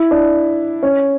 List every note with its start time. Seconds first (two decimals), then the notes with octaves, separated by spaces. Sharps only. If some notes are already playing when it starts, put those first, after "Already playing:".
Already playing: E4
0.11 D4
0.83 C#4